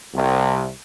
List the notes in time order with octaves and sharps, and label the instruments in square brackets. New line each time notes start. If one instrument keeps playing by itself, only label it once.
[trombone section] C2 C3